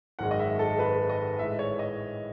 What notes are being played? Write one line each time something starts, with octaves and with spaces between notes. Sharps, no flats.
G#1 F#2 D#3 G#3 F#5
D#5
E5
A4
B4
D#5
A1 A2 G#3 E5
C#5
D#5